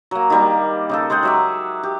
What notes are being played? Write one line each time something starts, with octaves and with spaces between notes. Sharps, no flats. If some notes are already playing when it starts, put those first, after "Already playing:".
F#3 A#3
D#3 G3 A#3
C#3 D#4 A4
G#3 G#4 F#5 G5
F#3 E5 D6
G4